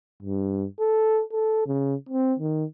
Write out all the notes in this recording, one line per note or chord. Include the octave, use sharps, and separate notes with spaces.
G2
A4
A4
C#3
C4
D#3